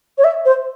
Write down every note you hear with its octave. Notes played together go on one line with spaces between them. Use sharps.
C#5
E5
C5